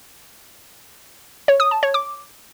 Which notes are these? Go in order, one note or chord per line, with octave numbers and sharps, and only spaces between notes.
C#5
D#6
A5
C#5
D6